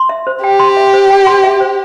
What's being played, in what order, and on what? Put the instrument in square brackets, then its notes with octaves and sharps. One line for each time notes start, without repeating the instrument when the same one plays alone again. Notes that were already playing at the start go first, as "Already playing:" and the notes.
Already playing: [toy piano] C6
E5
C5
[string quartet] G4 [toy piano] G5
[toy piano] C6
E5
C5
G5
C6
E5
C5